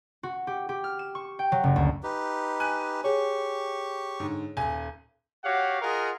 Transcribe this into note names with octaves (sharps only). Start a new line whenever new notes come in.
F#4
G4
G4
F6
E7
C#6
G5
F#3
F#1
D2
D#4 G4 B4
G#5 F#6 D#7
G4 G#4 C#5 C#6
G#2 D3
D#1 G#5
F#4 G4 C#5 F5 F#5
F4 G#4 A#4 D#5 F#5